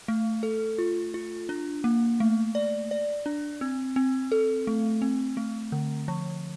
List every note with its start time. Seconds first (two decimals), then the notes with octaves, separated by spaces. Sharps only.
0.08 A3
0.43 A4
0.78 F4
1.14 F4
1.49 D4
1.84 A#3
2.20 A3
2.55 D5
2.91 D5
3.26 D4
3.61 C4
3.96 C4
4.32 A4
4.67 A3
5.02 C4
5.37 A3
5.72 D3
6.08 F3